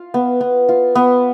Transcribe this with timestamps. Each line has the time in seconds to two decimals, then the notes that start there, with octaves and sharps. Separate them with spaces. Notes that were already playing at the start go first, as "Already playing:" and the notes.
Already playing: F4
0.14 B3
0.41 B3
0.69 F4
0.95 B3